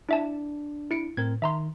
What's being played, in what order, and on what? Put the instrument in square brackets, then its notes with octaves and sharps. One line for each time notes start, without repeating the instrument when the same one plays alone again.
[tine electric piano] D4 [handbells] E4 E5 A5
[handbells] E4 C#7 D7
[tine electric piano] A2 C4 A#4 [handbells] G#6
[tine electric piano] D#3 [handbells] E5 A#5 C6